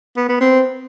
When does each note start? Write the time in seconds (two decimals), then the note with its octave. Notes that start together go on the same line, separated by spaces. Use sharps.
0.17 B3
0.29 B3
0.41 C4